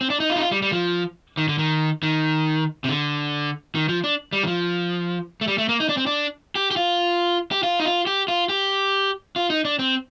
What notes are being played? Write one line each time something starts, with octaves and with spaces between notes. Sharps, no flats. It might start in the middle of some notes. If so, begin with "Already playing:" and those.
C4
D4
D#4
F4
D#4
F4
G3
G3
F3
D#3
D3
D#3
D#3
C3
D3
D#3
F3
D4
G3
D#3
F3
A3
G3
A3
A#3
D#4
D4
C4
D4
G4
G4
F4
G4
F4
D#4
F4
G4
F4
G4
F4
D#4
D4
C4